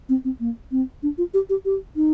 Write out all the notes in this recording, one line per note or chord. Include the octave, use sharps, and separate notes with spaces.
C4
C4
A#3
C4
D4
F4
G4
G4
G4
D#4